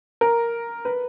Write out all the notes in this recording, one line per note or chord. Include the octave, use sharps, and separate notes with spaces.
A#4
B4